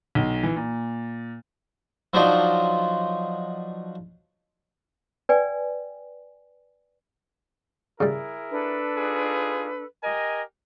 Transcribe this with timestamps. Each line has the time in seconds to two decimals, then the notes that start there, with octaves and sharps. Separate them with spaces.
0.15 B1
0.43 E3
0.56 A#2
2.14 F3 F#3 D4 D#4 F4
5.29 B4 D5 G5 G#5
8.00 C#3 G3 E4 G#4 A#4
8.51 D4 A4 B4
8.97 D#4 F4 G#4
10.04 G4 A#4 D#5 G#5